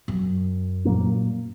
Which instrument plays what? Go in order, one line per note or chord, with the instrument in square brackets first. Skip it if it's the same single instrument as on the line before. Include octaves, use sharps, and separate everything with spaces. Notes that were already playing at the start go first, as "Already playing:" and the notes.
[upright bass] F#2
[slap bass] A#2 F#3 A#3 C#4